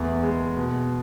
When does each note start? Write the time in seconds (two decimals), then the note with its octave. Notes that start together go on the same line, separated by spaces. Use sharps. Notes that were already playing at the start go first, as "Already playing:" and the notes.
Already playing: E2 A3
0.23 G#3
0.57 B2